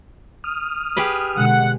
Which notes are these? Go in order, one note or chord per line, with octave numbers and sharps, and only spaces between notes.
D#6 F6
G4 G#4 B4
B2 D3 G#3 F#5